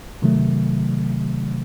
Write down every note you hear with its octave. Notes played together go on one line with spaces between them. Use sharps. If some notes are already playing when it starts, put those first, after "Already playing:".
C3 D#3 F#3 A3